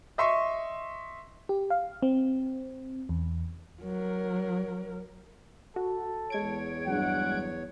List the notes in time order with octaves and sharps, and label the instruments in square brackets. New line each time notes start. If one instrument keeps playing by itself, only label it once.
[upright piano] D#5 E5 C6 C#6
[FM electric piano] G4
F5
C4
E2
[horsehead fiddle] F#3 A#4
[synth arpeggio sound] F#4 [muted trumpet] A4
[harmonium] E2 C#5 [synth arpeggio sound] G#3 G#6 D7
[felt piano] G2 F#3 [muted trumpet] F#5